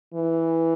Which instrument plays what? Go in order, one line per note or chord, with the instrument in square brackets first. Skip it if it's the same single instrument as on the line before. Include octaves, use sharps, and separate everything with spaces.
[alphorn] E3